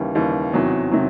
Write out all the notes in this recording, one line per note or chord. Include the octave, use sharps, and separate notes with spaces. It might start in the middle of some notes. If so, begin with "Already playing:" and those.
Already playing: D#2 C#3 E3 G3
D#2 C#3 E3 G3
E2 C3 D#3 F#3
C3 D#3 F#3